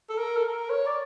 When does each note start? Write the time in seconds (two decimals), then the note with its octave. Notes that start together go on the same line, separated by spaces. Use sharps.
0.09 A4
0.18 A#4
0.37 A4
0.45 A#4
0.70 C#5
0.86 D5